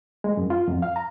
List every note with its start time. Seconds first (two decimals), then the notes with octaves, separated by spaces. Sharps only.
0.24 G#3
0.37 F#2
0.50 F4
0.68 F2
0.82 F5
0.96 A#5